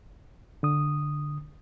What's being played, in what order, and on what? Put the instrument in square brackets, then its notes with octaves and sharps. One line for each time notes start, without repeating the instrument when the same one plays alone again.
[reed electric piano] D3 D#6